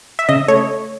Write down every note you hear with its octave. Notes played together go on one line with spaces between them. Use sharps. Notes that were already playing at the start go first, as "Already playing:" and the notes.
E5
C#3 D#5
A3 C#5